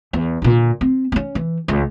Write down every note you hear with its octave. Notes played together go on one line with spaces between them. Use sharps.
E2
A#2 D3
C4
B3 C#4
E3
C#2